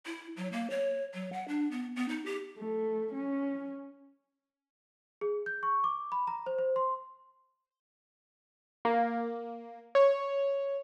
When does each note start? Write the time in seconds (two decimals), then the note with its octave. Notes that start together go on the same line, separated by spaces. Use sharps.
0.06 E4
0.37 F#3
0.52 A#3
0.70 C#5
1.14 F#3
1.33 F#5
1.48 D4
1.71 B3
1.96 B3
2.09 D#4
2.26 G4
2.58 A3
3.13 C#4
5.21 G#4
5.46 G6
5.63 C#6
5.84 D6
6.12 B5
6.27 A#5
6.46 C5
6.59 C5
6.76 C6
8.85 A#3
9.95 C#5